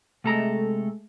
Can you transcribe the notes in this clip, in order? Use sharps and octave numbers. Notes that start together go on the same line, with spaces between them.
C3 G#3 A3 A4 A#5